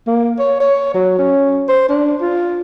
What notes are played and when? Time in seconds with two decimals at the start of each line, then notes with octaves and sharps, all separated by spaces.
0.07 A#3
0.39 C#5
0.60 C#5
0.95 F#3
1.19 C#4
1.69 C5
1.89 D4
2.21 F4